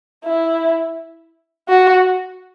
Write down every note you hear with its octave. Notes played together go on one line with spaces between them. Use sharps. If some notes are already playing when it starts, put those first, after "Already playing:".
E4
F#4